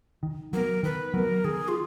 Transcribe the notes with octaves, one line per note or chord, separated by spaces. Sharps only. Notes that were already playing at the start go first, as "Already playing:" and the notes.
D#3
F#3 B3 A#4
D#3 B4
F#3 B3 A#4
D#3 G#4
F4